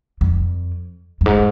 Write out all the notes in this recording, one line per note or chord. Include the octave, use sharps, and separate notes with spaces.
F2
F#2
G#2